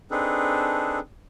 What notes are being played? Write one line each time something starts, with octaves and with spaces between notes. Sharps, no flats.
C4 D4 D#4 G#4 A4 B4